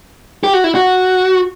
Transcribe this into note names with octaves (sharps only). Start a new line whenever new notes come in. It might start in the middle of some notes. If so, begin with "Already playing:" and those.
G4
F#4
E4
F#4